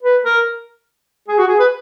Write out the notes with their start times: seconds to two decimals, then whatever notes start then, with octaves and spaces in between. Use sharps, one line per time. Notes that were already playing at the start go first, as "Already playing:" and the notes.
0.03 B4
0.24 A#4
1.28 G#4
1.38 F#4
1.48 G#4
1.59 B4